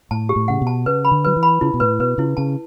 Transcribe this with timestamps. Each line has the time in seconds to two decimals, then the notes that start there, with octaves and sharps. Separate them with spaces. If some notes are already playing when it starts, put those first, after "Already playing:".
0.11 A2 A5
0.29 G4
0.36 A2
0.48 C#3 F#5
0.62 B2
0.67 A5
0.86 C#3 B4
1.05 B5
1.11 D3
1.25 F#3 B4
1.36 E3
1.43 B5
1.61 C#3 E4
1.74 B2
1.80 A2 B4
1.99 B2 B4
2.18 C#3 E4
2.37 C#3 A5